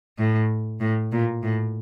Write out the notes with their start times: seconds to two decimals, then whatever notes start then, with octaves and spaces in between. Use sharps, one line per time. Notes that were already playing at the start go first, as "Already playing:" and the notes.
0.18 A2
0.80 A2
1.12 A#2
1.43 A2